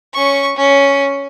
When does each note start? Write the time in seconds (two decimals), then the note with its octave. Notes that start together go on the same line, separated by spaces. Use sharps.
0.14 C#4 C#6
0.57 C#4